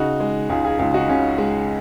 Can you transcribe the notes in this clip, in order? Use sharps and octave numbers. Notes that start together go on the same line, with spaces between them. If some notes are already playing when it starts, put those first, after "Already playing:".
Already playing: C#3 D#4 F#4
G#3
C#2 F4 G#4
F4 G#4
C#2 F4 G#4
D#4 F#4
C#3 C#4 F4
G#3